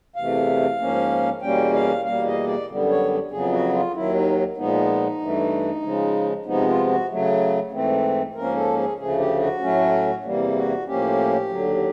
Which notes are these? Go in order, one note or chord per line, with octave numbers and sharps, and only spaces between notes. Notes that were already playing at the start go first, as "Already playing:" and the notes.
E2 C3 E3 A3 F5
G#2 F3 A#3 C#4
E2 B2 G3 A#3 C#4 G5
F5
E2 B2 G3 A#3 F5
D#5
D5
F#2 D3 G3 B3
C#5
F2 C#3 F#3 B3 G#4
F#4
F4
D#2 D#3 F#3 E4
D#4
A#2 F3 G#3 B3 D#4
G2 E3 A3
C#3 F3 G#3
C3 F3 G#3 B3 D#4
F4
F#4
C#3 F#3 A3
G#2 E3 A3 C4
G#2 F3 A#3 C#4 A#4
A4
G#4
D2 C#3 F3 A3 G#4
G4
F#4
A2 F#3 A3 C#4
E2 C3 E3 G3 A#3
F#4
A2 F3 A#3 C#4 G4
D#2 D3 F#3